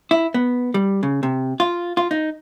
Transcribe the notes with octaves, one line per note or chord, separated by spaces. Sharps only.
E4
B3
G3
C#3
C3
F4
F4
D#4